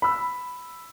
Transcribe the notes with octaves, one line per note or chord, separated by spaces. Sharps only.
B5 E6